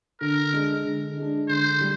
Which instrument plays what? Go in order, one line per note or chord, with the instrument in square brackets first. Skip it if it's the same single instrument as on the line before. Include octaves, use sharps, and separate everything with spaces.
[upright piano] D3 [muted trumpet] A#4
[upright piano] G#3 D4
D3
G#3 D4
[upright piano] D3 [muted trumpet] C5
[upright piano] G3